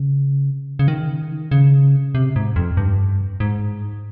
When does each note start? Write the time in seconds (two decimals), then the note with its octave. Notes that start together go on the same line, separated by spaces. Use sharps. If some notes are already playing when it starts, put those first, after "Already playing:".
Already playing: C#3
0.79 C#3
0.88 D#3
1.51 C#3
2.15 C3
2.36 G#2
2.56 F2
2.77 G2
3.40 G#2